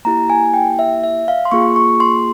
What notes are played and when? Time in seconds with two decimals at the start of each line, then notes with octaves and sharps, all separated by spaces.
0.05 A#3 E4 G4 A#5
0.30 G#5
0.54 G5
0.79 E5
1.04 E5
1.28 F5
1.45 C6
1.51 A#3 F4 G#4 C#6
1.76 C#6
2.00 C6